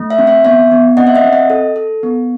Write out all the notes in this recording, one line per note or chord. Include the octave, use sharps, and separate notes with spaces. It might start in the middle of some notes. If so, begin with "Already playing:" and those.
Already playing: A3
E5
C4
E5
B3 E5
B3
C4 D#5 F#5
E5
D#5 F#5
C4
D#5
A4
A4
B3